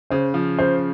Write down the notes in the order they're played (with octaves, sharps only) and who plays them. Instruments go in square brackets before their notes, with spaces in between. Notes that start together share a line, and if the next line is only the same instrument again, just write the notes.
[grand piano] C#3 [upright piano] C5
[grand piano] F3
[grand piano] C#3 [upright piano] C5